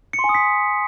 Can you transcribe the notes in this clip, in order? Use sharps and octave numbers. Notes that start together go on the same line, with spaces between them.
C#7
C6
G#5
D#6
B6